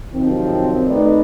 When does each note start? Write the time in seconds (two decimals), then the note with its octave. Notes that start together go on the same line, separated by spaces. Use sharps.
0.14 F#2 C3 D#3 F3 C4
0.87 A3 D#4 B4 D5